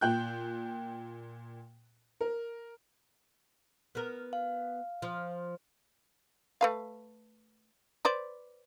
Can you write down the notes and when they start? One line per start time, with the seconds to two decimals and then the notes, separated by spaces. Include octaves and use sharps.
0.01 A#2 G5 F#6 G6
2.21 A#4
3.95 B3 A#4
4.33 F5
5.02 F3
6.61 A3 B4 F5
8.05 B4 C5 D5